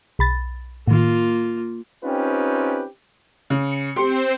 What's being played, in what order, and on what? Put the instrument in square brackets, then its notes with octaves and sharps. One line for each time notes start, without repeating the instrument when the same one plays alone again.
[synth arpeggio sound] B1 B5 A6
[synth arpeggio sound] A2 D#3 [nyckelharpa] A#3 F4
[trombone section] C4 C#4 D#4 F4 G4 B4
[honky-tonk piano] C#3 [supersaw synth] C#7
[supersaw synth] C4 C5 [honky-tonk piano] G4 C6